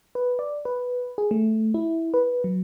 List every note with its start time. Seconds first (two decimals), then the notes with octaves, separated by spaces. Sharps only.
0.15 B4
0.39 D5
0.65 B4
1.18 G#4
1.31 A3
1.74 E4
2.14 B4
2.44 F#3